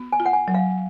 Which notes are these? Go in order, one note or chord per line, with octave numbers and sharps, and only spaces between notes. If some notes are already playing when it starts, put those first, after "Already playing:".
Already playing: B3
G#5
F4
F#5
G#5
F#3
F5